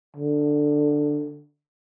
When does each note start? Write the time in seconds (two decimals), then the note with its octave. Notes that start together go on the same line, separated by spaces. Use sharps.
0.17 D3